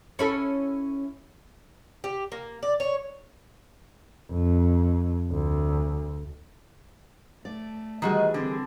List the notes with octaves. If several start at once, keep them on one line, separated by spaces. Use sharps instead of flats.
C#4 E4 A4
G4
A#3
D5
C#5
F2
D2
A3 D5
D#3 E3 G3 F#4 G#4 D#5
D3 C4